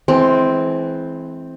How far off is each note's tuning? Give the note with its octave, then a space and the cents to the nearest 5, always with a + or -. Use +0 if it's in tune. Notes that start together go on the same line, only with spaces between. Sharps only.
E3 +0 G#3 +35 C4 +0